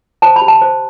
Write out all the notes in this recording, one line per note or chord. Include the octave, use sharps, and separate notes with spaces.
C5 A5
B5
G4
A5
C5